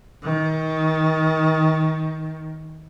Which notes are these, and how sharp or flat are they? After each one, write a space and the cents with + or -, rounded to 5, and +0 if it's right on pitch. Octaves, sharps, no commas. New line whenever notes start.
D#3 +25